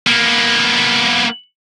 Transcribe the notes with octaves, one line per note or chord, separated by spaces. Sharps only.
A#3 B3